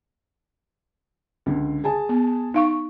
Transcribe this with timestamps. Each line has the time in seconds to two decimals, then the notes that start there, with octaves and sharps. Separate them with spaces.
1.46 C#2 D3
1.84 G#4 G#5 A5
2.09 B3
2.54 D#4 F5 C#6